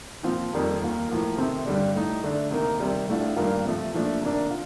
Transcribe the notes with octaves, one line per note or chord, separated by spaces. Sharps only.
A#2 F3 C4 F4
F2 D#3 G3 A#3
D#2 D#3 A#3 F4
A2 F3 A#3
C3 D#3 A3 C4
G2 D3 G3 D4
A2 A3 D#4
D3 A3 D4
C3 D#3 A#3 D#4
C3 D#3 G3
A2 A3 D4 F4
G2 D#3 G3 A#3 F4
C3 F3 A3
A#2 F3 A3 D4
C3 D#3 A#3 D4
F4